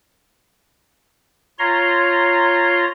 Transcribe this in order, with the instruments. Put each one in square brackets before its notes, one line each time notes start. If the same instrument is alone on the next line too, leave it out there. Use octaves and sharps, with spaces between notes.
[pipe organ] F4 C#5 A#5 C6